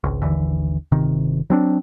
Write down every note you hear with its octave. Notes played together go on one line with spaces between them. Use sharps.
G#1 C#2
G#1 D#2 D3 E3
G1 C3 D#3
F#3 C4 D4